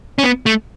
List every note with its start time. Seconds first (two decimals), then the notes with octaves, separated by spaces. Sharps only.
0.18 C#4
0.24 B3
0.46 A3